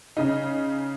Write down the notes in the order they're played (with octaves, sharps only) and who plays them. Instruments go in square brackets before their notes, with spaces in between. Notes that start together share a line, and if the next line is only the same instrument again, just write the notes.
[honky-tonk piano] C#3 D#4